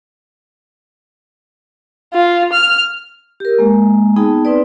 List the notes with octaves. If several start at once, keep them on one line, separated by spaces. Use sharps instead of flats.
F4
F6
G4 A#4
G#3 A#3
B3 D#4 G#4 G5 A5
C4 D#4 B4 D5